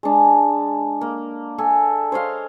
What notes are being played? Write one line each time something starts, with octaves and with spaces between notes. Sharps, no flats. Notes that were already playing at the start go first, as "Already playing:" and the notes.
G#3 D4
A#3
A4 E5 G#5
C5 C#5 D#5 F5